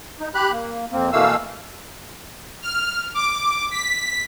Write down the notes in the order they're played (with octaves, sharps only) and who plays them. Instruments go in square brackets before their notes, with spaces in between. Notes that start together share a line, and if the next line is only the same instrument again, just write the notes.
[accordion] D#4
G4 B5 F#6
A#3
F2 A#3 C4
B2 E3 A3 A#3 F5 E6
[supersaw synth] F6
D6
B6